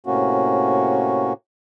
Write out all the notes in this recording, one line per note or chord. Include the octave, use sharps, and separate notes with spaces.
A2 C3 A#3 C#4 F#4